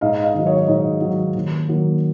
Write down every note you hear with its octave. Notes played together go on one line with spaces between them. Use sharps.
G#2 D#5 F5
D#5 F5
D#3 F#3
C#5 D#5
G#2 C#5 D#5
D#3 F#3
D#2
D#3 F#3 A#3